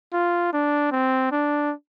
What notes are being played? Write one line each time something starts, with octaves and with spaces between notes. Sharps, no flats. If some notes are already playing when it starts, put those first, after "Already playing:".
F4
D4
C4
D4